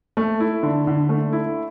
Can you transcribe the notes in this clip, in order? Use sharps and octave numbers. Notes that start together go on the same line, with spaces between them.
A3
E4
D3
D3
A3
E4